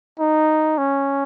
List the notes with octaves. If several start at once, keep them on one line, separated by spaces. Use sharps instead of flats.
D#4
C#4